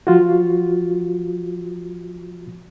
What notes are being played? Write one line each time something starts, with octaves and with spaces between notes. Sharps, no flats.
F3 F4 F#4